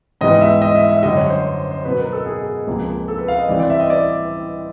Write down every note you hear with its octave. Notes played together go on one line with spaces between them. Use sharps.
G#2 E3 G3 B3 D#5
E5
D#5
E5
E5
F#2 D3 G3 D#5
C#5
C5
C5
B2 F#3 B3 B4
A#4
A4
G#4
C#2 C3 F3 A#3
A4
B4
F5
D#5
G2 E3 G3 C4 D5
D5
E5
D#5
D5